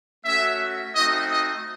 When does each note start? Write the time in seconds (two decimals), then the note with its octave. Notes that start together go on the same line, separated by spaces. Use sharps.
0.25 A3 C#4 F#4 E5
0.96 A3 C4 D#4 F#4 D#5
1.31 D#5